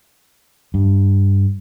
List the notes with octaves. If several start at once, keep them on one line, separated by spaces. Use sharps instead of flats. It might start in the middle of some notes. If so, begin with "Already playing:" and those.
G2